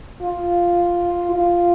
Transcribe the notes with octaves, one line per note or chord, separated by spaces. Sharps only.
F4
F4